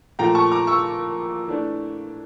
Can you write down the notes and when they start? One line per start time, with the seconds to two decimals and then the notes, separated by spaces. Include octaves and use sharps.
0.19 A#2 F3 A3 G5 A#5
0.35 A5 C#6
0.52 A#5 D6
0.67 C#6 E6
1.48 E3 A3 D4